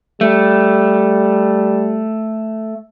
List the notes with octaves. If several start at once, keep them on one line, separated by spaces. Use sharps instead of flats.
G3 A3